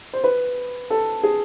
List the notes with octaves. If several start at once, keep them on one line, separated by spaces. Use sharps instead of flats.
C5
B4
A4
G#4